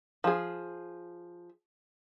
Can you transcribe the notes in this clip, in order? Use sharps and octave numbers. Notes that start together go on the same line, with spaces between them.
F3 G#4